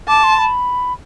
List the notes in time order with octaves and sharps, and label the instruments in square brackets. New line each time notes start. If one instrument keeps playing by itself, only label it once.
[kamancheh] A5 [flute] D6
[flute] C6
B5